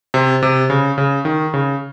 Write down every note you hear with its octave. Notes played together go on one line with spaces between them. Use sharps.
C3
C3
C#3
C#3
D#3
C#3